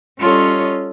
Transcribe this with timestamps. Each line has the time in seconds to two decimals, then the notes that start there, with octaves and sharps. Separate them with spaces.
0.19 G3 C#4 F4 A4 C#5 D#5